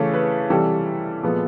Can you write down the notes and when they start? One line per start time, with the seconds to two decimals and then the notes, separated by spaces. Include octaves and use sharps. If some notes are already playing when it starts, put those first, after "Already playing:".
Already playing: C#3 E3 A3 A4
0.14 B4
0.50 C3 E3 G3 A4
1.23 A#2 F3 G#3 B3